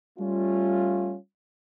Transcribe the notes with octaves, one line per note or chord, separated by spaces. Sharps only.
G3 A3 C#4 F4